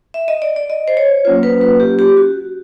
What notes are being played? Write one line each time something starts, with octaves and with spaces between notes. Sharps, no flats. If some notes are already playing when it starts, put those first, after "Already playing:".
E5
D#5
D5
D5
D#5
C5
C#5
F#3 A#3 C#4 F4 C5
B4
B4
G4
G4
F#4